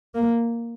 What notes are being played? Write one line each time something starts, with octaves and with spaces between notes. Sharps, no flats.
A#3